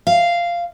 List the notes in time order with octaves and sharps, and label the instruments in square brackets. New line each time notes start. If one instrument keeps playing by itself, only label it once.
[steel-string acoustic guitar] F5